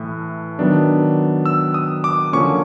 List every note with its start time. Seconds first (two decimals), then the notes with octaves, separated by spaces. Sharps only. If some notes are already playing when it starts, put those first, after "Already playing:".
Already playing: A2 E3 A3
0.59 D#3 F#3 B3 D4
1.46 E6
1.74 D#6
2.04 D6
2.33 D3 F3 A#3 C#4 C#6